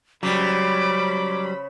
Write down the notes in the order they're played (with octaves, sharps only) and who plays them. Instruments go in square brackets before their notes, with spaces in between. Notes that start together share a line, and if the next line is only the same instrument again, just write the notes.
[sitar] C#3 [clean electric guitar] F#3 G3 [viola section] C5 B5 [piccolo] D6